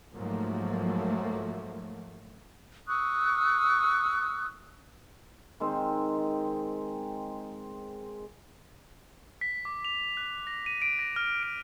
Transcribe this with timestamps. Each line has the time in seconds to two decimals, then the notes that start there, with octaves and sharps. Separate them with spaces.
0.14 G#2 F3 F#3 A3 A#3
2.87 C#6 D#6 E6 F#6
5.60 D#3 G#3 C4
9.41 B6
9.65 D6
9.85 F7
10.17 F#6
10.47 A#6
10.66 D#7
10.82 D7
10.99 A#6
11.16 F6
11.43 D7